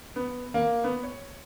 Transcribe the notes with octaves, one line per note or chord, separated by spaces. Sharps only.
B3
A#3
B3
C#5